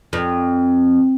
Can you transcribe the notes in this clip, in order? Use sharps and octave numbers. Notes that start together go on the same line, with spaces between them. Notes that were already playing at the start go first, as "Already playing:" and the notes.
F2